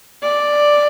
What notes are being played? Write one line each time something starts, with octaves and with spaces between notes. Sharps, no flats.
D5